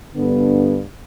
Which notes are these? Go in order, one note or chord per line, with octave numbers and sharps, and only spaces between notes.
G2 D3 B3